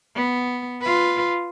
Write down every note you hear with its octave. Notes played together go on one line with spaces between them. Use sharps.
B3
F4 B4